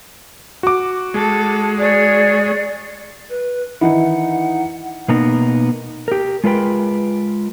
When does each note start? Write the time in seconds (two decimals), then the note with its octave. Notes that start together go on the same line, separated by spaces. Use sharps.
0.63 F#4 D6
1.14 G#3 A4
1.79 G#4 C#5 D5
3.29 B4
3.81 D#3 E3 D#4 E4 F#5
5.08 B2 A#3 B3 D#4
6.08 G4 A#4
6.44 G#3 F4 A#4 B4 G5